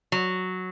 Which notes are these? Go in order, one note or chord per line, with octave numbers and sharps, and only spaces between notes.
F#3